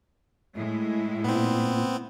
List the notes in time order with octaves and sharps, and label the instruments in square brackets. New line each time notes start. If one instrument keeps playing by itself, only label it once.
[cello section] A2 G#3 [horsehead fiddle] E4
[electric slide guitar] A#2 [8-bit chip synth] B3 C4